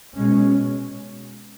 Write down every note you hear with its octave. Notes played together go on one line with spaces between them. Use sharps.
B2 G#3 C#4